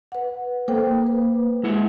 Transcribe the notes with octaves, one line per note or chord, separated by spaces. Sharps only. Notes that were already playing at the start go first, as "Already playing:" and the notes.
B4 F#5
A#3 A4 C5 G5
B4
G#3 E4 F#5